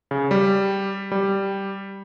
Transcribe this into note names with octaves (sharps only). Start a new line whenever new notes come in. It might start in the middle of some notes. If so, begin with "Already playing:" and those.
C#3
G3
G3